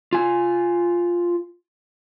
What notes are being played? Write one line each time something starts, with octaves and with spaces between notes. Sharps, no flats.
F4 G#5